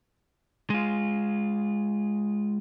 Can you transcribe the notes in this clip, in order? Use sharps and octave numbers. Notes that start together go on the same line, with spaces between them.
G#3 F4